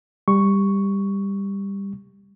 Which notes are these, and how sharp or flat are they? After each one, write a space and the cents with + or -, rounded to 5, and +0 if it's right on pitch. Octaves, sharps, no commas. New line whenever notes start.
G3 +15 C#6 +5